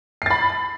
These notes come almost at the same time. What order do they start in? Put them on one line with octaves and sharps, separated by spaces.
C7 A6 B5